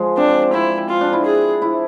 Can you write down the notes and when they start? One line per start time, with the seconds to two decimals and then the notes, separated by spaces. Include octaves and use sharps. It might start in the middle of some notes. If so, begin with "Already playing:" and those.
Already playing: F3 G#3
0.17 C4 D4
0.53 C4 E4
0.89 F4
1.01 D4
1.13 E4
1.25 G#4
1.62 E4